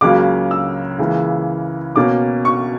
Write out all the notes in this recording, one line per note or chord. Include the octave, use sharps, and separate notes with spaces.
C#2 C#3 F#3 A#3 D6
E6
C#2 C#3 E3 A#3
B2 A#3 C#4 D6
C#6